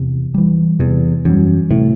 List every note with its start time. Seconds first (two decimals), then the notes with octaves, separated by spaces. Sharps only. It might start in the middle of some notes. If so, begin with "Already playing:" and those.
Already playing: E2 C3
0.34 E3 G3
0.79 E2 C3
1.25 F#2 E3 G3
1.70 A2 C3